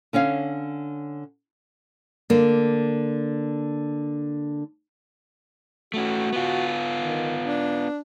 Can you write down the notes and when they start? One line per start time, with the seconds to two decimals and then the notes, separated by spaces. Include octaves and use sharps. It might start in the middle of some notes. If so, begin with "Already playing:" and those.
0.13 D3 C#4 C#5 F5
2.30 D3 A#3
5.94 A3 C#4 F#4
6.33 B3 F4
6.97 D#3
7.44 D4